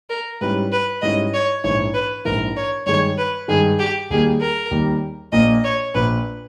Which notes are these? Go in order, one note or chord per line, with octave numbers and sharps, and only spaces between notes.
A#4
G#2 G3 C#4 E4 B4
B4
G#2 G3 C#4 E4 D#5
C#5
A#1 G#2 E3 C#5
B4
A#1 G#2 E3 A#4
C#5
G2 D#3 G#3 C#5
B4
G2 D#3 G#3 G#4
G4
D#2 D#3 G3 A#3 G#4
A#4
D#2 D#3 G3 A#3
A#1 A#2 A#3 D#5
C#5
A#1 A#2 A#3 B4